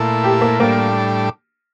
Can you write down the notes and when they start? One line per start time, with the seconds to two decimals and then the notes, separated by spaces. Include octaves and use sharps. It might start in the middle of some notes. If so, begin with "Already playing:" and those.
Already playing: A#2 A3 E4
0.24 G4
0.41 A#3
0.60 A2 G3 A#3 D4